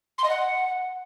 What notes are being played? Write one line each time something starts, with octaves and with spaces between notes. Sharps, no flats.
C6
D#5
F#5